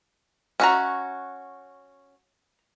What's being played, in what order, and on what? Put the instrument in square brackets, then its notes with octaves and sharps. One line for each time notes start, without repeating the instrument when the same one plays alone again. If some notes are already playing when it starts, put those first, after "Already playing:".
[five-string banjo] C#4 F#4 [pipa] D#5 E5 A#5